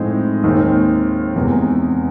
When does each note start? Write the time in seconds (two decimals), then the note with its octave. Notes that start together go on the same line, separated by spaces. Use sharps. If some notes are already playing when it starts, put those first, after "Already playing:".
Already playing: A2 F3 G#3 C4 D#4
0.44 D#2 D#3 G#3 C4
1.35 E2 C3 D#3 G#3